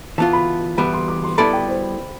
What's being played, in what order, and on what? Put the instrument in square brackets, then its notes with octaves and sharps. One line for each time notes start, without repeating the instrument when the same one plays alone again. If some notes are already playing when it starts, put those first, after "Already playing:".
[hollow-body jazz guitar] E3 B3 F4 [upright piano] A5
[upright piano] B5
[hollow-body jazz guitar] E3 G3 B3 [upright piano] B5
[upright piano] C6
D6
C6
[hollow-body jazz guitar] G3 B3 E4 A4 D5 [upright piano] B5
[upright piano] G5
C5